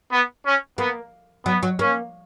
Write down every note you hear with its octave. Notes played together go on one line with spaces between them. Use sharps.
B3
C#4
A#3 B3
F#3 B3
F#3
A#3 C#4